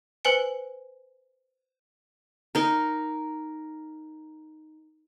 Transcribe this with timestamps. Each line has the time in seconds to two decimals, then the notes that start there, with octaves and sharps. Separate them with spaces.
0.25 B4 C5 G#5 C#7
2.55 D#4 A#4